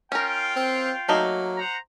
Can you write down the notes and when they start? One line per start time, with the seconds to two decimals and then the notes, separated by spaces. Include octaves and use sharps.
0.12 C#4 F4 A#4 F5 G5
0.56 C4
1.09 F#3 A3 A#3 D#4
1.58 C5 F#5 A#5